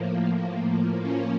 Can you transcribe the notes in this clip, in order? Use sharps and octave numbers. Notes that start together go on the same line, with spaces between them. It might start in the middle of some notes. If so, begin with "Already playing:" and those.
Already playing: A2 F3 A#3
F3 A#3 C#4